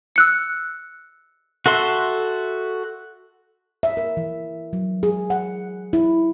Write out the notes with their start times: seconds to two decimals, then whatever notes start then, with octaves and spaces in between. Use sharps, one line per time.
0.16 E6 F#6 C#7
1.66 F#4 A4 E5 C6
3.83 E5
3.97 A#4
4.17 E3
4.73 F#3
5.03 G#4
5.30 F#5
5.93 E4